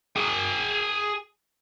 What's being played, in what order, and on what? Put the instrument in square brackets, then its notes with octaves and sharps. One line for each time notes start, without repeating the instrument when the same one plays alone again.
[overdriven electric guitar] G#4 G5